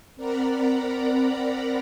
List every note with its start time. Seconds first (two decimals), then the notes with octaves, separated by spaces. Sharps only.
0.16 C4 A#4 D5 F#5 A#5 B5